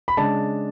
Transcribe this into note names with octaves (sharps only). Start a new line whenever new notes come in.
B5
C#3 G#3 D4 A5